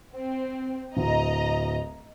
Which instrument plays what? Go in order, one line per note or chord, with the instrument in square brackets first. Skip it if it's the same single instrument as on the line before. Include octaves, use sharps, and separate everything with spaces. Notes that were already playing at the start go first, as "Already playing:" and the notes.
[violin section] C4
[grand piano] D1 [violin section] D#5 A#5